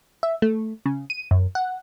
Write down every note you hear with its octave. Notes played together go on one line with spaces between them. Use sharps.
E5
A3
C#3
D#7
F#2
F#5